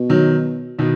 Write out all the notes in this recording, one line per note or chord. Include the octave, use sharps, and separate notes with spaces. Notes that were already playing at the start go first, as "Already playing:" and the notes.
Already playing: B2
D#3 F#3
B2 D#3